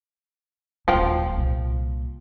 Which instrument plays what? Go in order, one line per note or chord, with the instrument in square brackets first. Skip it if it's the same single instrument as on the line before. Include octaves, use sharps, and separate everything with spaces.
[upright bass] D#1 F#3 [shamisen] F3 F4 G5
[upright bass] C2 A#2